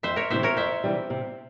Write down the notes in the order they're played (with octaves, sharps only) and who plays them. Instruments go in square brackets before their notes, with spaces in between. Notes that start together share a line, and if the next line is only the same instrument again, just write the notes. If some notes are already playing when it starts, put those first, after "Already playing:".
[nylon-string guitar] F2 [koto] C5 E5
[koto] A#4 C#5
[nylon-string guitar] C3 E3 G3 [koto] C5 E5
[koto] A#4 C#5
[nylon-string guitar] F2 [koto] C5 E5
[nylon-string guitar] C3 E3 G3
C3